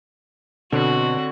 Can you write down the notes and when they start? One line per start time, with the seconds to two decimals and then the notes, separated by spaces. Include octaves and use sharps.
0.72 B2 D3 C4 F#4 C#5